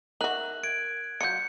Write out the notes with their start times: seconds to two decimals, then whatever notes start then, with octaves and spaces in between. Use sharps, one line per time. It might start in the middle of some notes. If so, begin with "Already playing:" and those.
0.21 D#4 F#4 A#4 E5 F#6 F#7
0.64 G#6 D7
1.21 F#3 F4 G6 C#7